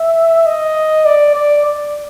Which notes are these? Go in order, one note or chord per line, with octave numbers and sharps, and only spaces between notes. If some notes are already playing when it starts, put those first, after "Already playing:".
Already playing: E5
D#5
D5
D5
D5